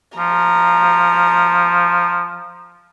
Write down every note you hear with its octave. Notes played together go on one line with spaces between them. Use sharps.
F3 A#5